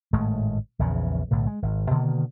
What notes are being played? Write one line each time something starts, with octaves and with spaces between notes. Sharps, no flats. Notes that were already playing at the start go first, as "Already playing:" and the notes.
G#1 A2 G#3 A3
A#1 E2 C#3
B1 A2 D3
G#3
G#1
B2 D3 D#3 A#3